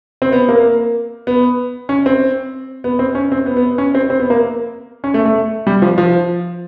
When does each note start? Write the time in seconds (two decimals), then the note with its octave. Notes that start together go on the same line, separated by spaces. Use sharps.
0.22 C4
0.32 B3
0.49 A#3
1.27 B3
1.89 C#4
2.06 C4
2.84 B3
2.99 C4
3.15 C#4
3.32 C4
3.46 B3
3.57 B3
3.78 C#4
3.95 C4
4.10 C4
4.20 B3
4.30 A#3
5.04 C#4
5.14 A3
5.25 A3
5.67 G3
5.82 F3
5.98 F3